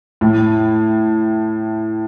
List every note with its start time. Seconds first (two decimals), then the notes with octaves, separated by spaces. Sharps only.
0.21 A2